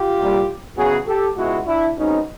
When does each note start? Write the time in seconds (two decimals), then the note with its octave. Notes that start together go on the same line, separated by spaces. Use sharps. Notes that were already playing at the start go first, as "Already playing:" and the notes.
Already playing: F4 G4
0.16 C2 A#2 G3
0.76 E2 C#3 F#3 B3 F#4 G#4
1.06 G4 A4
1.37 C#2 B2 G#3 E4 F#4
1.67 D4 E4
1.97 B2 G#3 C4 C#4 D#4